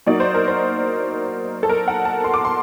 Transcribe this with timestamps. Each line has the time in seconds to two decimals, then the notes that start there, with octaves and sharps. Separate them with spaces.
0.06 F#3 A#3 D#4 D5
0.20 C5
0.35 A#4
0.48 C5
1.63 A4
1.69 A#4
1.88 F#5
2.05 A5
2.24 C6
2.34 D6
2.45 C6